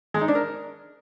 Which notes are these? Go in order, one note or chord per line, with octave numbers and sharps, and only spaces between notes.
G#3
D#4
D4
A#4